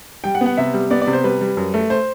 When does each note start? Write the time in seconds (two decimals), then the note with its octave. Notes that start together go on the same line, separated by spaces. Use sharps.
0.24 G3 G5
0.35 F#5
0.41 B3
0.46 F#5
0.57 C3 E5
0.74 G3
0.91 B3 D5
1.01 D5
1.07 C3
1.13 C5
1.24 G3 B4
1.41 G3
1.57 F#2
1.74 A3
1.90 C5